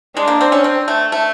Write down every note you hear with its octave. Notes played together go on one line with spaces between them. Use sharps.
G#3 D4
A#3
C4
C#4
C4
A3
A3